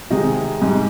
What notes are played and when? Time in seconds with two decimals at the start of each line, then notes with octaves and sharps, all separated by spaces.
0.10 C3 D#3 G#3 D#4
0.62 G#2 G3